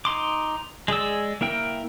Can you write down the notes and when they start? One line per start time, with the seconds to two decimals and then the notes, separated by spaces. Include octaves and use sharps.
0.05 D#4 C6 D6
0.88 G#3 G#4 D5 E6
1.41 A#3 E4 A#4 G5